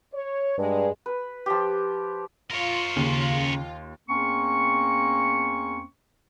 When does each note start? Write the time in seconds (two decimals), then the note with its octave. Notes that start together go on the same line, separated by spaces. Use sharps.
0.13 C#5
0.58 G2 G#3
1.06 B4
1.46 F3 G4
2.51 F4 A#4 C#5
2.96 D#2 C#3
4.09 E2 A#3 C4 C#4 C#6